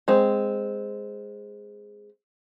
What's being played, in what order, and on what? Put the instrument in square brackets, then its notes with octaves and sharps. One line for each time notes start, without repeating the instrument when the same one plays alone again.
[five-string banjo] G#3 C4